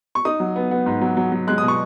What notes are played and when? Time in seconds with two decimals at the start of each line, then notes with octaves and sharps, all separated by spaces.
0.15 C#6
0.25 D#4 D#6
0.40 F#3
0.56 B3
0.71 B3
0.86 G#2
1.01 F#3
1.17 F#3
1.32 F#3
1.47 G#3 F#6
1.58 D#6
1.63 B2
1.68 C#6